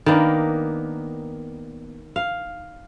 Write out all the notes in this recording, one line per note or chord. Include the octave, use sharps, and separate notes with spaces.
D#3 A#3 B3 D4
F5